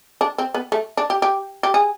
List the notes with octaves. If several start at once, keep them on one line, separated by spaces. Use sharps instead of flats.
D4
C4
B3
A3
D4
G4
G4
G4
G#4